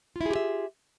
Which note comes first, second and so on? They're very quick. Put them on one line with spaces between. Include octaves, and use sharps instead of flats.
F4 E4 G#4 G4 E5